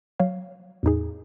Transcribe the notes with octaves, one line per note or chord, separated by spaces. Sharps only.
F#3 C#5 F5
E2 A2 D#4 G#4